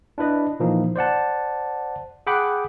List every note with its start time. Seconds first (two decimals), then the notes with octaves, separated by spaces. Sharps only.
0.18 D4 E4 B4 D#5
0.60 A#2 E3 F3 A#3 D#4
0.96 C5 D5 F#5 A5
2.27 G#4 F#5 G5 B5 D6 F#6